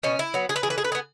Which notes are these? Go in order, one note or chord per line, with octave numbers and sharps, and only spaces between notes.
B2 C#4
E4
F#3 B3
G#4
B4
E3 G#4
B4
G#4
B4
G#4
B3